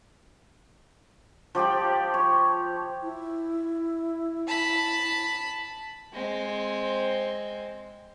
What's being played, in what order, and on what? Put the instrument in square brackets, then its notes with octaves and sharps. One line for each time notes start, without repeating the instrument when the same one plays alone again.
[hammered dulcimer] F3 G4 D5 G5
C#5
[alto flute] E4
[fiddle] A5 B5
[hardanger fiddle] G#3 C4